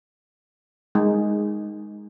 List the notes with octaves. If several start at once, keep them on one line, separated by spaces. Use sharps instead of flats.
G#3 D#4